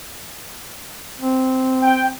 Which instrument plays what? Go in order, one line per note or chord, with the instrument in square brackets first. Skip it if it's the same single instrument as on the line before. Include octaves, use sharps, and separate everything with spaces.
[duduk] C4
[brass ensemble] G5